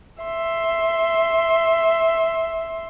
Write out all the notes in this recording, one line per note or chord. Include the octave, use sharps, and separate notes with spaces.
E5 C6